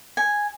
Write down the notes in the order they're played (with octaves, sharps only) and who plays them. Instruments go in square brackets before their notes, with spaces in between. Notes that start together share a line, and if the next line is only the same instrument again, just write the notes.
[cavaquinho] G#5